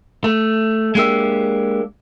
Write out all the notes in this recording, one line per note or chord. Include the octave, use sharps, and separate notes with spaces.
A3
G#3 A#3 D4 G4 E5